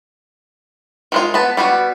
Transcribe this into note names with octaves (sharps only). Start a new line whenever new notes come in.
D#3 G#3 F4
B3 A5
G3 B3 D#4 F#4